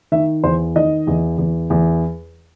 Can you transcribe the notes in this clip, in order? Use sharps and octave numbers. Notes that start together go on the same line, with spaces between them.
D#3 E5
E2 C5
D#3 D#5
E2
E2
E2